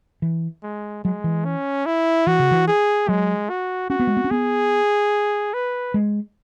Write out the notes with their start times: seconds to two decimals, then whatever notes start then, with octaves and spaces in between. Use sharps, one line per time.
0.22 E3
0.63 G#3
1.04 F#3 G#3
1.24 E3
1.45 C#4
1.86 E4
2.27 E3 F#4
2.39 C#3
2.51 E3
2.68 G#4
3.09 F#3 G#3
3.50 F#4
3.90 C#4 F#4
4.00 B3
4.07 G#3
4.17 B3
4.24 C#4
4.31 B3 G#4
5.54 B4
5.94 G#3